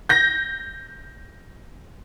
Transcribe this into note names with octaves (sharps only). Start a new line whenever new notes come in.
G6 A#6